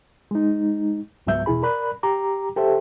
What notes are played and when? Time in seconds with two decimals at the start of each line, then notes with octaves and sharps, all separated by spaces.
0.31 G#3 D#4
1.27 C#2 G#2 F#3 B3 E5 G6
1.46 E2 B2 E4 G#4 B5
1.63 A#4 D5 B5 F#6
2.03 G4 A#5 D6
2.56 G4 A4 C5 E5